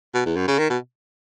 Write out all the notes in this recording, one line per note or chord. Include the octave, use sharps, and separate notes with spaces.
B2
E2
F#2
C#3
D#3
B2